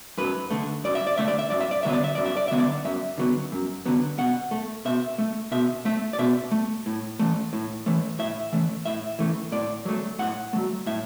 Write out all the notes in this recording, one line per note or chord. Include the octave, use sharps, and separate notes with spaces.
F#2 B4
D3 A3
F#2 D5
E5
D5
D3 A3 E5
D5
E5
F#2 D5
E5
D5
D3 F#3 B3 E5
D5
E5
F#2 D5
E5
D5
D3 F#3 B3 E5
D5
F#2 E5
D3 F#3 B3
F#2
D3 F#3 B3
B2 F#5
A3
B2 E5
A3
B2 E5
A3 E5
D5
B2 E5
A3
A2
E3 A3
A2
E3 A3
A2 E5
E3 A3
A2 E5
E3 A3
A2 D5
F#3 A3
A2 F#5
F#3 A3
A2 E5